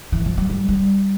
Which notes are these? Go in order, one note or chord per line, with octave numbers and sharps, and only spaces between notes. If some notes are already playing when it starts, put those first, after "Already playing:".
E3
F3
F#3
G3
G3